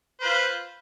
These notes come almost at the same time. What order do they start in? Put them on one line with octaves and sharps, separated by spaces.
C5 B4 F4